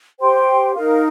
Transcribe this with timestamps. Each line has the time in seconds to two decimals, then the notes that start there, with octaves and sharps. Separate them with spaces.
0.20 G4 C5 G5 C6
0.74 D#4 A#4 F5